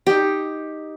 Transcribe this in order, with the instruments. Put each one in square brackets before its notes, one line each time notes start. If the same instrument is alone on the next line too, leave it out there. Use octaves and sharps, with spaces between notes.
[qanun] D#4 G4